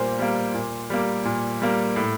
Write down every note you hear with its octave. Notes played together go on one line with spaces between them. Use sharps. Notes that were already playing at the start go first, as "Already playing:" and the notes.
Already playing: A#2 G3 A#3 C5
G3 A#3
A#2
G3 A#3
A#2
G3 A#3
A2